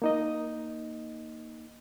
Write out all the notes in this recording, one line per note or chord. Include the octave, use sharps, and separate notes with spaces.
A#3 D#4 D#5